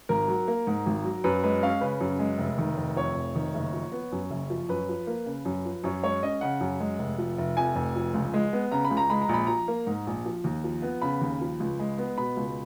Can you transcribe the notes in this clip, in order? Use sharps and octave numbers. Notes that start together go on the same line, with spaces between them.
G#1 A#4
F#3
A#3
G#2
G#1
F#3
F#2 B4
G#3 B4
C#4 F5
C#3 B4
F#2
G#3
F1
D#3
F1
F2 C#5
F1
D#3
F#1
F3
B3
F#2
F#1
F3
F#2 B4
F3
A#3
C#3
F#2
F3
F#2 C#5
G#3 C#5
C#4 D#5
C#3 F#5
F#2
G#3
F1
F3
F1
F2 G#5
F1
F3
C#2
G#3
B3
C#3 A#5
B5
C#2
A#5
G#3 B5
A#5
A#1 B5
F3 A#5
A#3
G#2
A#1
F3
D#2
F3
B3
C#3 B5
D#2
F3
C#2
G#3
B3
B2 B5
C#2